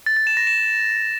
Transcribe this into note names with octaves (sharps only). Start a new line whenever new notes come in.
A6
A6
E7
A#6
E7